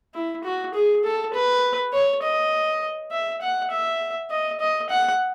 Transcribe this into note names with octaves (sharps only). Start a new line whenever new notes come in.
E4
F#4
G#4
A4
B4
C#5
D#5
E5
F#5
E5
D#5
D#5
F#5